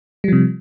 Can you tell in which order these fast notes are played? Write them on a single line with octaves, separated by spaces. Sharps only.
G3 F3 C3